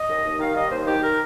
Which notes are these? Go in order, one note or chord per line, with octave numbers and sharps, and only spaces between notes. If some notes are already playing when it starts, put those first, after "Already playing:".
Already playing: D#5
D#2
D#2
D#3 F5
G3 D#5
D#2 C5
D#3 G4
A#4